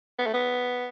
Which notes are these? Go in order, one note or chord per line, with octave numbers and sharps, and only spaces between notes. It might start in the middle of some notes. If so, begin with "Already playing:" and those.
B3
A3
B3